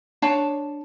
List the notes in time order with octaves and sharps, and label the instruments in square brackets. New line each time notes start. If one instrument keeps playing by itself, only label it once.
[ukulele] D4 C#5 A5